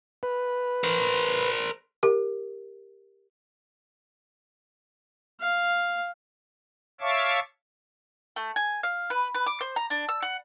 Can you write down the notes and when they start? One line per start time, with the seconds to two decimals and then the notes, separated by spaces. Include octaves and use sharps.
0.23 B4
0.84 A#4 C5
2.03 G4 A#4
5.40 F5
7.01 C#5 E5 F5 A5 C#6 D6
8.36 A3
8.56 G#5
8.83 F5
9.10 B4
9.35 B4
9.46 D6
9.61 C5
9.76 A#5
9.90 D4
10.09 E6
10.22 F#5